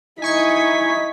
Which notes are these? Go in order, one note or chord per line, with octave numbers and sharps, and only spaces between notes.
D#4 E4 G#5 C#6 G#6 B6